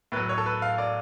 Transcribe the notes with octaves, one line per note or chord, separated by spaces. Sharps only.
A2 F#3 B4
C#5
A4
B4
F5
D5